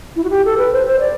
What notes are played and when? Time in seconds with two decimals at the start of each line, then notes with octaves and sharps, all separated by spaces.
0.16 E4
0.24 F#4
0.30 G4
0.45 A4
0.58 B4
0.73 C5
0.87 C5
1.00 D5